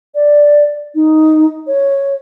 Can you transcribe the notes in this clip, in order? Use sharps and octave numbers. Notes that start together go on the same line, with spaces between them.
D5
D#4
C#5